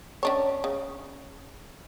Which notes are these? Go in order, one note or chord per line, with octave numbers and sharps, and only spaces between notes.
C#4 D4 C#5
C#3